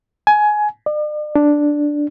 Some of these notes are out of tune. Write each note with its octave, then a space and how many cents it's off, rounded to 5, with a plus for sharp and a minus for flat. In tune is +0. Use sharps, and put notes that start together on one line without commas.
G#5 +20
D5 +45
D4 +0